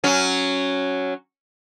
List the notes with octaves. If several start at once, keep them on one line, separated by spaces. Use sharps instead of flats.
F#3 C#4